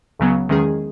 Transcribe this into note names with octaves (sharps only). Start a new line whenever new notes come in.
C#2 C#3 F#3 B3
E2 D#3 G#3 C#4 G#4